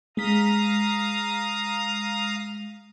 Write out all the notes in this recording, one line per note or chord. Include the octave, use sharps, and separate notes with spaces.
G#3 F5 A#5 D#6 B6